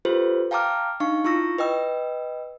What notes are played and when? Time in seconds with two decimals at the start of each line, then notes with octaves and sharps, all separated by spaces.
0.05 F4 G4 A4 B4 C5
0.51 F5 G5 A5 A#5 D6 F6
1.00 D4 D#4 F5 C#6
1.25 E4 F4 C#6 E6 A#6
1.58 B4 D#5 G5 E6